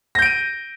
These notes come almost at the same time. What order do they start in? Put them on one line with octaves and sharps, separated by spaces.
A#6 G6 D7 D#7